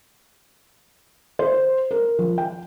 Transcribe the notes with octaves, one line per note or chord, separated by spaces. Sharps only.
C5
A#4
F3
G5